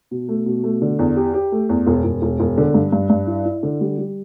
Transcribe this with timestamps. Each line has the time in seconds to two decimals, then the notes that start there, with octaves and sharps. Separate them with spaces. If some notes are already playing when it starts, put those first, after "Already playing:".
0.11 B2
0.28 A3
0.46 B2
0.64 A3
0.82 D3
0.99 E2
1.16 G4
1.34 G4
1.52 A3
1.69 E2
1.87 E1
2.04 E1
2.22 E1
2.40 E1
2.57 D3
2.74 G2
2.92 G2
3.10 G2
3.27 E4
3.45 E4
3.63 D3
3.81 G3
3.98 G3